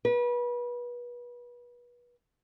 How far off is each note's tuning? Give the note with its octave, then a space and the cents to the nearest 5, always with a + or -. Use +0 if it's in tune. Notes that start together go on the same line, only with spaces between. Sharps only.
B4 -30